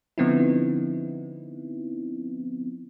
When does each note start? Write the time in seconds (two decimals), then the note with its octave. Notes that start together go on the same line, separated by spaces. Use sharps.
0.18 D3 F3 B3 C4 D#4 E4